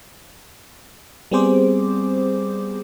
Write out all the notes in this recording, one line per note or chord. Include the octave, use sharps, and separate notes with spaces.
G3 B3 C4 G#4 C5 D6